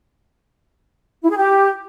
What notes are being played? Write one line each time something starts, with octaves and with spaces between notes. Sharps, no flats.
E4
G#4
G4